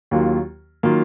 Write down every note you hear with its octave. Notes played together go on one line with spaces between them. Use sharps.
D#2 D#3 F#3 A#3 F4
D#3 F#3 A#3 F4